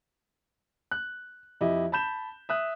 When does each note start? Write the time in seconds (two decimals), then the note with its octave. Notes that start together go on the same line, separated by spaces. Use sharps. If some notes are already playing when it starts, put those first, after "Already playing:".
0.91 F#6
1.61 F2 E4 G4 D#5
1.92 A5 B5 G6 E7
2.49 E5 D#6 F#6